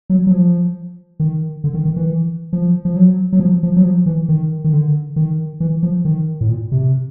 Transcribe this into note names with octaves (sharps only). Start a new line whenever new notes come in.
F#3
F#3
F3
D#3
D3
D#3
D#3
E3
F3
F3
F#3
F#3
F3
F3
F#3
F3
E3
D#3
D#3
D3
D#3
E3
F3
D#3
A2
A#2
C3